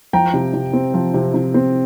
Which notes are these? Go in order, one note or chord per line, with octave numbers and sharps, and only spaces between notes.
F3 G5 A#5
C3
C3
C4
F3
C3
C3
C4